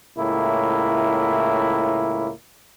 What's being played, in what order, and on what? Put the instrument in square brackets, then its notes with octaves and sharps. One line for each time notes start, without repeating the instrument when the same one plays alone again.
[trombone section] C#2 A2 A#3 E4